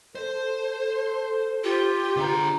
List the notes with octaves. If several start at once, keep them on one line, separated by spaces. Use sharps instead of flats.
A4 C5
F4 G4
D3 G#4 B4 A#5